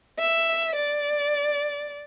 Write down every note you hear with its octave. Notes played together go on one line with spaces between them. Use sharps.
E5
D5